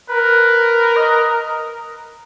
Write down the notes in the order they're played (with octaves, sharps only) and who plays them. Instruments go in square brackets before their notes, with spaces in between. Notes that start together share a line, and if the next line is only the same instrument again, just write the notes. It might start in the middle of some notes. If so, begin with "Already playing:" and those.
[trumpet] A#4 [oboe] B4
[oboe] D#5